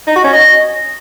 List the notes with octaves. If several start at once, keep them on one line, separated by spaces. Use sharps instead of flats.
D#4
F#4
C#4
D#5